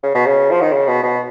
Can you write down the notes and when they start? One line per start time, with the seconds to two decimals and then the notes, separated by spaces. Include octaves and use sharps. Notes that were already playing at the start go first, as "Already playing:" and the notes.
0.03 C#3
0.15 B2
0.26 C#3
0.50 F3
0.61 D#3
0.73 C#3
0.88 B2
1.03 B2